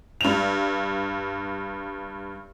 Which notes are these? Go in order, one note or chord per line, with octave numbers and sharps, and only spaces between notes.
G2 F7